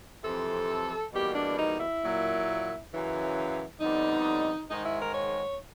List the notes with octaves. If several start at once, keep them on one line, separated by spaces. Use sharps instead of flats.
F2 C3 E3 A4
E2 B2 G3 A#3 G4
D4
D#4
E4
A#2 F#3 A#3
F#2 C#3 E3
F2 D3 G3 B3 D#4
G#2 D#3 G#3 D#4
E4
A#4
C#5